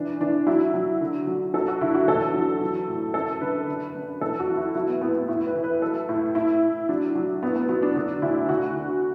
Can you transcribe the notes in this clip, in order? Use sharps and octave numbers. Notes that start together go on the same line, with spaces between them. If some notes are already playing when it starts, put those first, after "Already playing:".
Already playing: E3 D4
E3 D4
F#3 E4
F#3
D3
F#3
F#3 A4
F#4
D3 E4
F#4
E2 A4
F#3
F#3
A2
F#2 A4
D3 B4
D3
F#2
E2 A4
F#4
F#3
E4
F#3 E4
B3
A2 B3
B3
A2 E4
B4
E3
B4
F#3 A4
A2 E4
A2 E4
A2
F#3 D4
F#3
A2 B3
B3
F#3 B3
D4
D3 D4
D2 E4
D2 F#4
D3